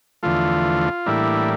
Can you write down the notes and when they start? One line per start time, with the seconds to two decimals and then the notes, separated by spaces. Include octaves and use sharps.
0.23 E2 D3 F3 A3 F4
1.06 A2 E3 G3 A#3 D4 E4